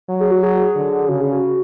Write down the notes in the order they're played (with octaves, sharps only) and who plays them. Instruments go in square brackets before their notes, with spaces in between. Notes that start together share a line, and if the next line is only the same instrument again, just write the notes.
[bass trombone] F#3
[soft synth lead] G#4
F#4
G#4
[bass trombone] D3
[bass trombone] C#3 [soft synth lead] F#4
[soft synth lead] G#4
F#4